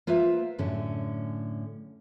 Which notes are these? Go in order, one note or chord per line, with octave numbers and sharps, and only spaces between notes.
A#3 F4 B4 C5 E5
F#2 A2 D3 C#4